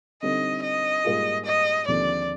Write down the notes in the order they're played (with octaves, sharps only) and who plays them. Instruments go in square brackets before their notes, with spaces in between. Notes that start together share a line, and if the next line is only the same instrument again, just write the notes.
[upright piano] D3 G3 C4 D#4 [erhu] D#5
[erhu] D#5
[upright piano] G#2 G3 A#3 F4 G#4
[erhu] D#5
[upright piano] D#2 D3 F3 C4 [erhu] D5